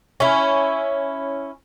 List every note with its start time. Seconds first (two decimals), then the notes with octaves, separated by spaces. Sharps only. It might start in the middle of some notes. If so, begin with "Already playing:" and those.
0.20 C#4 E4